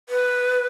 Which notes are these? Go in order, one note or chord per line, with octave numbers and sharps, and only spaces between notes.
B4